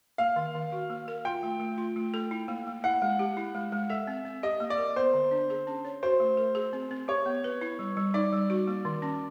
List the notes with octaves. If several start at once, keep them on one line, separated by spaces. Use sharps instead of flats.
A#3 F5
D#3
D#3
F#4
A#3
A#4
F4 G5
A3
A3
F4
A3
A4
E4
A#3
A#3
E4 F#5
G#3
G4
E4
G#3
G#3
A4 E5
C4
C4
G4 D#5
A#3
D5
A#4
B3 C5
D3
D4
G#4
C#4
C#5
F#4 C5
A3
A#4
G#4
C4
C4
G4 C#5
B3
B4
E4
G3
G3
D#4 D5
G3
F#4
A#3
D#3
C#4